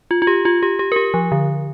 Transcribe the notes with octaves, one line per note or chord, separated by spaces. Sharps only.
F4
F4
G4
F4
G4
G4
A#4
G4
F3
D3